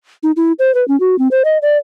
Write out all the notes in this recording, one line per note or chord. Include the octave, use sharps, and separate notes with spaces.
D#4
E4
C5
B4
C#4
F#4
C4
C5
D#5
D5